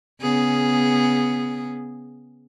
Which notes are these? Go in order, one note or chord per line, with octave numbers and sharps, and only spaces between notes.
C#3 B3 G#4